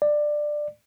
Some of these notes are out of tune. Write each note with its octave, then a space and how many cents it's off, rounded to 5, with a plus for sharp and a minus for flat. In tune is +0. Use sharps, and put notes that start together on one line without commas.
D5 +15